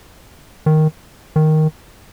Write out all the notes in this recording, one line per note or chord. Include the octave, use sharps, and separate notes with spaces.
D#3
D#3